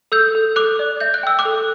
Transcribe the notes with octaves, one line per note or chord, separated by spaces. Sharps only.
A4 E6 G6
A4
A4 D6 F#6
D5
E5 G6
F#6
G5 E6
D6 F#6
A4